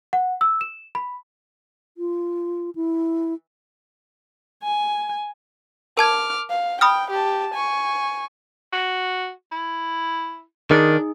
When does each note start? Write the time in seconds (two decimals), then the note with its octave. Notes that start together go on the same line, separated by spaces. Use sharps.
0.13 F#5
0.41 E6
0.61 E7
0.95 B5
1.97 F4
2.75 E4
4.63 G#5
5.97 A#4 A5 D6 F6 G#6
6.50 F5
6.81 G5 B5 D#6 F6
7.11 G4 A5
7.54 G#5 C#6
8.73 F#4
9.52 E4
10.71 D#3 D4 D#4 G#4